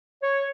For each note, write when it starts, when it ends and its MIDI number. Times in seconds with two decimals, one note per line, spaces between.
0.22 0.47 73